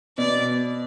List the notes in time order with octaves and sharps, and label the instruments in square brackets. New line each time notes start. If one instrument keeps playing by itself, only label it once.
[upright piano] B2 [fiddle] D5